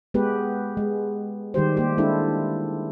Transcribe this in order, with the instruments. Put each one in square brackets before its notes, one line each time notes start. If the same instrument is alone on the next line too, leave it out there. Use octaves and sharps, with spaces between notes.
[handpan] G#3 B3 G4 B4
G#3
D#3 G3 G4 C5
A#3 G4
G#3 D4 E4 A4